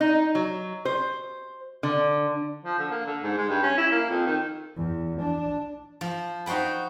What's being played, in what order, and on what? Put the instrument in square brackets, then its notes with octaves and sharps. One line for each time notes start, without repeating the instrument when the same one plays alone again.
[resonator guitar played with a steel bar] D#4
F#3
C5
D3
[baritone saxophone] F3
D3
A#3
D3
G#2
G#3
G2
C#4
E4
A#3
F2
D#3
[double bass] E2
D4
[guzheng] F3
D#4 F#4 C5 G5 B5